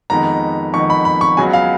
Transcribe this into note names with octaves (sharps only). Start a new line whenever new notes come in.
F2 D#3 G#3 B3 A#5
F2 D#3 G#3 B3 C#6
B5
B5
C#6
C#2 C#3 F#3 B3 G#5
F5